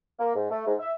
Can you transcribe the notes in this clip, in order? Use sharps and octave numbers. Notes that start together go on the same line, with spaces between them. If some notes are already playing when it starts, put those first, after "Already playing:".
A#3
G#2
A3
G#2
E5